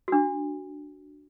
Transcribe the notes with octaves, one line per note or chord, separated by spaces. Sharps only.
D4 F#4